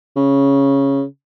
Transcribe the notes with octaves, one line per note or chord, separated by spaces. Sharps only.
C#3